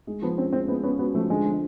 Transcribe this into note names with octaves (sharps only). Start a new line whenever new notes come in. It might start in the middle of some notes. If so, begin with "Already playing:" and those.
G#3
F3 B3
C4 C#4
G#3 C4
G#3 B3
B3 C#4
B3 F#4
F3 A3
D3 G#3
F3